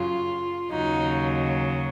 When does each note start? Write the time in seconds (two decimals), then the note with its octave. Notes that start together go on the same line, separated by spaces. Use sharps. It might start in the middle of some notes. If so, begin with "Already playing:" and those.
Already playing: F#2 C#3 F#3 F4
0.71 D#2 C#3 F#3 D#4